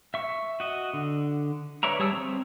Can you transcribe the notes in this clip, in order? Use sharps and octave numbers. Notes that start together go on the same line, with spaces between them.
E5 C#6
F#4 D#5
D3
B4 C#5 D5 E5 A#5
G3 G#4 C#5 A5 E6
C4